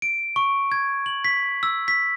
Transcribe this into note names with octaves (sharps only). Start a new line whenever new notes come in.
D7
C#6
G#6
F#7
B6
E6
B6